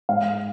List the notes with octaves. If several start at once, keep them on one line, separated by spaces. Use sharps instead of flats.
G#2 F5